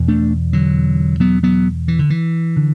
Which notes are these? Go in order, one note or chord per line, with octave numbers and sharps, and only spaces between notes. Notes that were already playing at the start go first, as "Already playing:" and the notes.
Already playing: E2 B2
A3 D4
D3 F#3
F#3 B3
F#3 B3
E3
D3
E3
D3